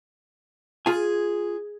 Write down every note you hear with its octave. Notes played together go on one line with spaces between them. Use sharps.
F4 G#4 G#5